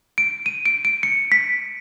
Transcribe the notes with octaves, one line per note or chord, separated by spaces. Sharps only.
D7
D#7
D7
D7
C#7
B6